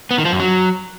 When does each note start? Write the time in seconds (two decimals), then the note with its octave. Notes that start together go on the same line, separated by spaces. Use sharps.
0.11 B3
0.18 D#3
0.25 F3
0.33 F#2
0.40 F#3